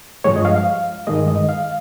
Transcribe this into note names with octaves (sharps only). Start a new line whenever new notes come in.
G2 F3 G#3 C#5
D#5
F5
F5
G2 D#3 G#3 D#5
D#5
F5